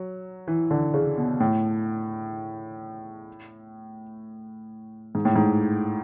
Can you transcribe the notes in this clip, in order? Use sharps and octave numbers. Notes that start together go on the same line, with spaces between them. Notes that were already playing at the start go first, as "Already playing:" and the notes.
Already playing: F#3
E3
D3
C#3
B2
A2
G#2
A2
G#2